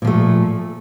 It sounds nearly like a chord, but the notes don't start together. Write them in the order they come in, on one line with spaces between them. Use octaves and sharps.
A#2 F3 A3